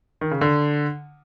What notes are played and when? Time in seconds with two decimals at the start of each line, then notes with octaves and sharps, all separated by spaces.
0.21 D#3
0.31 C#3
0.41 D3